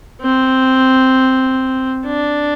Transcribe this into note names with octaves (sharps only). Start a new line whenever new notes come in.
C4
D4